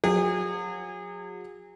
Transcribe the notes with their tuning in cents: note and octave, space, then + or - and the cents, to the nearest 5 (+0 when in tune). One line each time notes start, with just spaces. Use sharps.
F#3 -30 G#4 -35